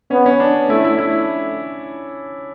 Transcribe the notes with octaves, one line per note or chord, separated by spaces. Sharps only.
B3 C#4
C#4
D4
A3 E4
E4
E4